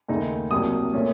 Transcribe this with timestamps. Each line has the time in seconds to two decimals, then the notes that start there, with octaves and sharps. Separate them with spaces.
0.08 D#2 C#3 A3 D#4
0.51 C2 C3 F#3 A#3 D#6
0.93 A#2 A3 C#4